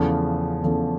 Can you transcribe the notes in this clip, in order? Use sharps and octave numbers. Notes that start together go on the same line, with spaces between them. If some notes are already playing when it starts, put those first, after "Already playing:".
Already playing: E2 C#3 F3 A3
E2 C#3 F3 A3